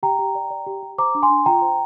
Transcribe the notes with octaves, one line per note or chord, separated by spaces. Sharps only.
G4 G5 A#5
G4
D5
D5
G4
G4
C5 A#5 D6
D4
G#5 C6
D4
F4 G5 A#5
C5